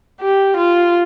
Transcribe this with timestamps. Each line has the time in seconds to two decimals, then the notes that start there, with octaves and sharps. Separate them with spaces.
0.21 G4
0.57 F4